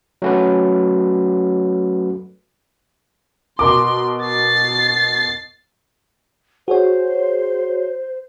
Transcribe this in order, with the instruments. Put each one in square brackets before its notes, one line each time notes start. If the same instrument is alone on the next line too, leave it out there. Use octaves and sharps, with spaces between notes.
[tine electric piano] F#3 A3 C#4 F#4 A4 B4
[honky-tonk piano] B2 A#4 D6 [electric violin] C6
[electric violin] A6 C7
[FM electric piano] F#4 G#4 C#5 [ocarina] C5